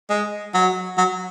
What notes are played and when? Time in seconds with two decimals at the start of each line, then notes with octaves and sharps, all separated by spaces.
0.10 G#3
0.54 F#3
0.98 F#3